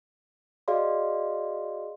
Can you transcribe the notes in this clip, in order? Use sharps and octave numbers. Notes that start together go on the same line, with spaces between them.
F#4 G#4 D5 D#5 F5 C6